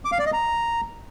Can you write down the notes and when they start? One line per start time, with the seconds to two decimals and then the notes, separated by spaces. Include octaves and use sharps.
0.05 D6
0.12 F5
0.19 D5
0.26 D#5
0.33 A#5